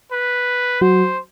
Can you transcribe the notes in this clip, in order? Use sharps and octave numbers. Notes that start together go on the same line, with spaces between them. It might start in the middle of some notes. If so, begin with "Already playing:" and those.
B4
F#3 F#4 C5